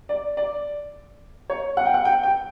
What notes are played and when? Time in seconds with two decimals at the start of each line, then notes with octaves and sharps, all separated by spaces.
0.09 D5
0.37 D5
1.50 C#5
1.77 F#5
1.86 G5
1.94 F#5
2.05 G5
2.23 G5